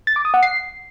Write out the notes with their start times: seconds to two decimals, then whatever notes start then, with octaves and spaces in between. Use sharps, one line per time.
0.07 A6
0.16 D6
0.25 D#6
0.34 F#5
0.43 C7